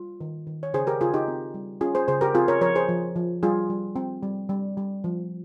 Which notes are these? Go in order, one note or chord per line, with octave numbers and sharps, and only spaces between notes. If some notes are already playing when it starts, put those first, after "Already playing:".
Already playing: G3 F4
D#3
D#3
C#5
C#3 G#4 C5
G4 A#4
C#3 F4 G#4
D#4 G4
C4
G3
C#4 F4 G#4
G#4 C5
C#3 G#4 C5
G4 A#4
C4 F4 G#4
A#4 C#5
F3 A#4 C#5
G#4 C5
F3
F3
G3 F4 G#4
G3
C4
G3
G3
G3
F3